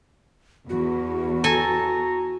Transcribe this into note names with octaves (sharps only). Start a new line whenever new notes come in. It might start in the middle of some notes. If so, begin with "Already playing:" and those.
E2 F#4
A4 G#5 A#5